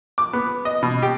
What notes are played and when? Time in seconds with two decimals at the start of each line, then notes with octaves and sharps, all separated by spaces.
0.18 D6
0.33 B3
0.65 D#5
0.83 B2
1.02 G4